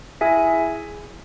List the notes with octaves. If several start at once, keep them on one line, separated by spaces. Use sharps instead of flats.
E4 G#4 E5 G#5